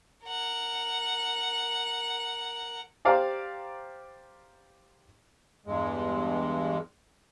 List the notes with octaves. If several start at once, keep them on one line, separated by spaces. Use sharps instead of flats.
A#4 F#5
G4 C5 D5 F5 G5 A#5
E2 G2 G#3